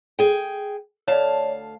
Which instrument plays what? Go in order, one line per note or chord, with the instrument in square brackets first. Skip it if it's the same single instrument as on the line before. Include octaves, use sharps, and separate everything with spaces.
[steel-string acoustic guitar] G#4 G5
[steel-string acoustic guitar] D2 F5 A5 [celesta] C#5 D5